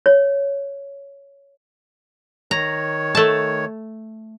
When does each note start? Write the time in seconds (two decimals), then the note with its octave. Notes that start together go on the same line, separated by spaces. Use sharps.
0.06 C#5
2.51 D#3 C#5 A#5
3.15 A3 A5